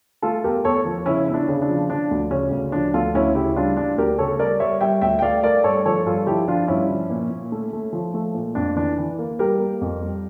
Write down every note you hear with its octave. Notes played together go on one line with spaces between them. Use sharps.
A3 F4 A4
E2 G4 A#4
E2 A4 C#5
F3
C#3 C#4 E4
E2 E4
D4
C#3
D4
F3
F3 D4
D2
C#3 C#4
D2
F3 D4
D2 F4 A4
D2 C#4 E4
C#3 E4 G4
G3 D4 F4
G3 D4
D2 G4 A#4
C#3 A4 C#5
G3 A#4 D5
G3 C#5 E5
G3 E5 G5
D2 E5 G5
G5
A3 D5 F5
A3 A#4 D5
G2 A4 C#5
F3 A4 C#5
G2 F4 A4
F3 E4 G4
F3 D4 F4
G2 C#4 E4
F3
A#2
A#2
A3
A3
F3
A3
A#2
F2 D4
E3 D4
E3
A#3
G3 G4 A#4
A#3
F2
G3